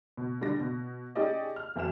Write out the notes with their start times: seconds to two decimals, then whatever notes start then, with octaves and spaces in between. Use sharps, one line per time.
0.17 B2
0.41 D3 G3 D5 A#6
0.60 B2
1.15 C#4 D#4 G4 G#4 D5 D#5
1.56 F6
1.76 F2 E3 F#4 F6 E7